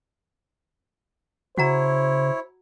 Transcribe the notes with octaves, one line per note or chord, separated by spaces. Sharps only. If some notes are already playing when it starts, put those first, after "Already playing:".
C#3 E4 F#4 C5 C#5 F#5 A#5